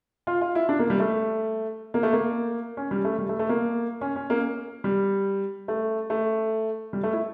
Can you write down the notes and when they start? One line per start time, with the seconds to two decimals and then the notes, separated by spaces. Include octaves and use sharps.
0.27 F4
0.41 F4
0.55 E4
0.69 D4
0.79 A#3
0.90 G3
1.00 A3
1.94 A#3
2.03 A3
2.13 A#3
2.77 C#4
2.91 G3
3.05 A3
3.18 G3
3.29 A3
3.39 A3
3.49 A#3
4.01 C#4
4.16 C#4
4.30 A#3
4.84 G3
5.68 A3
6.10 A3
6.93 G3
7.03 A3
7.13 E4